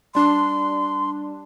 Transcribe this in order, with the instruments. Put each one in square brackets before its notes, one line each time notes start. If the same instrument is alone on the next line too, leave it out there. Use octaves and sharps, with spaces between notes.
[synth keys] G3 D4 [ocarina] C6